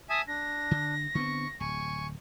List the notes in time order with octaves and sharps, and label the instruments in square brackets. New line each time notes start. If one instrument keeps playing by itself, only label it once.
[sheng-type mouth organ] E5 G#5 A5 [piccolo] D#6
[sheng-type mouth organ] D4 [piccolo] A#6
[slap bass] D3
[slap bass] D3 B3 C4 [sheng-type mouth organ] C#6
[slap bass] D1 [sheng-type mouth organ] G#5 C#6